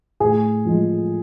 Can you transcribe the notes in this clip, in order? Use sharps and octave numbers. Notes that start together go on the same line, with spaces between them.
A2 G#4
F3 G#3